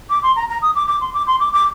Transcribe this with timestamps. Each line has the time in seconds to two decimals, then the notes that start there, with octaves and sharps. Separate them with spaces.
0.10 D6
0.23 C6
0.36 A#5
0.49 A#5
0.62 D#6
0.75 D6
0.88 D6
1.01 C6
1.14 D6
1.27 C6
1.40 D6
1.53 D6